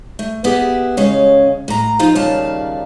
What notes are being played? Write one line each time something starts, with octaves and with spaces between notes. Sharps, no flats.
A3
B3 E4 G4 G#4 B4
C#3 G#3 C#4 C#5 F5
A2 A#5
F3 D#4 F4 F5
D#2 A#2 C#3 G3 F5 A5